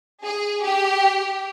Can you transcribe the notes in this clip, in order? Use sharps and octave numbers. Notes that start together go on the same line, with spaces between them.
G#4
G4